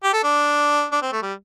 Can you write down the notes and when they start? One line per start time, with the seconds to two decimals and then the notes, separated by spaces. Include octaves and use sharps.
0.03 G4
0.13 A4
0.23 D4
0.92 D4
1.02 C4
1.12 A3
1.22 G3